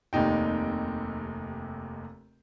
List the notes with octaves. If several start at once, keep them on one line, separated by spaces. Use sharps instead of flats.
F1 D#2 C3 D#4 G5